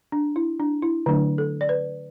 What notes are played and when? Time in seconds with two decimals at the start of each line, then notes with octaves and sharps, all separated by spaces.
0.12 D4
0.36 E4
0.60 D4
0.82 E4
1.06 D3 F#3 A3 D4
1.38 A4
1.61 D5
1.69 B4